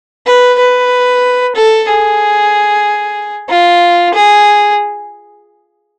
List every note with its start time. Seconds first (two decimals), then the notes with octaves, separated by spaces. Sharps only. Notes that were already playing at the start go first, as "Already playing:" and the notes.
0.26 B4
0.59 B4
1.56 A4
1.89 G#4
3.50 F4
4.14 G#4